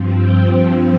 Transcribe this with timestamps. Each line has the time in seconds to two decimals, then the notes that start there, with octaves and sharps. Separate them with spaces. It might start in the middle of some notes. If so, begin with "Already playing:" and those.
Already playing: G2 F3 C4
0.15 G5